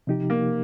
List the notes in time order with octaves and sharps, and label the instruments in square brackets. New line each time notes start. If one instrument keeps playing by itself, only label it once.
[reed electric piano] C3 F3 D#4 G4
[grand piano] A#3